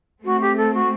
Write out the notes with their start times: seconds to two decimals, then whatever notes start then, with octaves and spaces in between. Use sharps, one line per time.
0.24 A3 C4 F#4
0.40 G4
0.56 A4
0.74 F#4